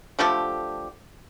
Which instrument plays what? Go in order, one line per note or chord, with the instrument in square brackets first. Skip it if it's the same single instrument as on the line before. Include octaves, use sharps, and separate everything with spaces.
[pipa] D3 F3 A3 G4